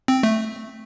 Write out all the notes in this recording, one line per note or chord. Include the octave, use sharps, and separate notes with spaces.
C4
A3